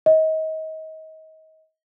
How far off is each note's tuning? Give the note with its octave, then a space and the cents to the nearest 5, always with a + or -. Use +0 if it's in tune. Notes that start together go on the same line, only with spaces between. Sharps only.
D#5 +30